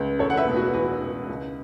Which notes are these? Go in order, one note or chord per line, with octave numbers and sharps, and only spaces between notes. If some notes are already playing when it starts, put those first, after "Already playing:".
Already playing: C#2
E1 A4 C#5
F#5
B4 E5
B2
F#4 B4
E2 F#4 B4
E1
C#2